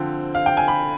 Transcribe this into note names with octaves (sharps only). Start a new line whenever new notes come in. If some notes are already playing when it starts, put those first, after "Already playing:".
Already playing: D3 F3 C4 G5
F5
G5
G#5
B5